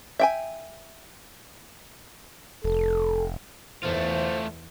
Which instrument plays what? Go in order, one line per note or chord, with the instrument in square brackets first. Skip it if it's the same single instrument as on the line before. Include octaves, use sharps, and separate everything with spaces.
[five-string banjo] E5 G5 G#5
[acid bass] F1 [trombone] A4
[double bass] E2 [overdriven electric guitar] A3 F4 [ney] C5